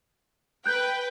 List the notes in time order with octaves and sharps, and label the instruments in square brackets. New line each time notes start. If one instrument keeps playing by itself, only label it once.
[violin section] B4 G5 [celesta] F#6 G6